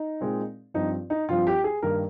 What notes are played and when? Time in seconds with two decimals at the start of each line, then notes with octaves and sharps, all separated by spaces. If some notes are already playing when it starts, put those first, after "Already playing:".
Already playing: D#4
0.21 A#2 G#3 C4
0.74 G2 F3 C4 D#4
1.10 D#4
1.28 G2 F3 C4 F4
1.47 G4
1.64 G#4
1.82 G2 D#3 A#3 A#4